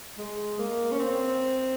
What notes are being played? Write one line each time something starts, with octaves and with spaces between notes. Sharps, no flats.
G#3
A#3
C#4
C4